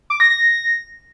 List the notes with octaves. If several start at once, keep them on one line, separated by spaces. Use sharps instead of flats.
D6
A#6
A#6